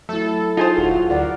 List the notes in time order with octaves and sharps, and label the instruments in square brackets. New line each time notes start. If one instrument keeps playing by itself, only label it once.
[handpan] F#3 E4 [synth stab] A3 [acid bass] A4
[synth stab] D#4 G#4 C5 [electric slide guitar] F4
[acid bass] D#1 [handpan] F#4
[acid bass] D2 [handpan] A#4 D5 F#5